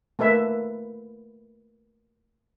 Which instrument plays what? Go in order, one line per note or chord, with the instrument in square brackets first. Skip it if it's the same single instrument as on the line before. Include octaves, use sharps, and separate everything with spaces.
[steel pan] A3 A#3 B4 E5